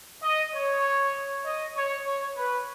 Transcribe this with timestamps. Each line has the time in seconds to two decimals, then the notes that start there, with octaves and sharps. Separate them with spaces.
0.23 D#5
0.54 C#5
1.45 D#5
1.75 C#5
2.06 C#5
2.36 B4